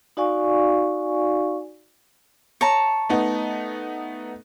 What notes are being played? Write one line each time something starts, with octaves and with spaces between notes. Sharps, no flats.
D#4 F#4 D5 F5 G#5 C#6
C#5 A5 A#5
A3 B3 D#4